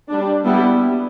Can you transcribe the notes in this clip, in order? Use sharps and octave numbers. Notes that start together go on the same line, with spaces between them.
G3 D4
G3 B3 E4